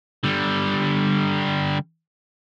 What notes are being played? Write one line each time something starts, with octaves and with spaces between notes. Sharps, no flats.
D3 G3